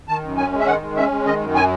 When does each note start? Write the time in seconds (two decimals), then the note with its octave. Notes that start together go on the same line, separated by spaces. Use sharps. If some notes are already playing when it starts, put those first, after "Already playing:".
0.08 D#3 A5
0.23 F#2
0.37 C#4 G#5
0.53 G#3
0.59 E5
0.66 D#3 F#5
0.81 G#3
0.96 C#4 E5
1.11 G#3
1.26 D#3 D#5
1.40 F#2
1.55 G#5